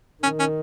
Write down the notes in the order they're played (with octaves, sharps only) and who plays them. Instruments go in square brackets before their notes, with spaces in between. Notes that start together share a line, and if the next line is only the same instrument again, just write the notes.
[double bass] D#3 [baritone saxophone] C#4
[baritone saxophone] C#4